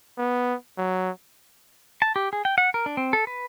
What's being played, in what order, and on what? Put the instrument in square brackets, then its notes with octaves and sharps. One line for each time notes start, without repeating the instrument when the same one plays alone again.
[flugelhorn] B3
F#3
[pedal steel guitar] A5
G4
G#4
G5
F#5
A#4
D4
C4
A4
B4